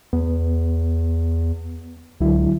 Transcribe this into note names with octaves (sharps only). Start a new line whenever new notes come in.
E2 B3
C#2 D3 F#3 E4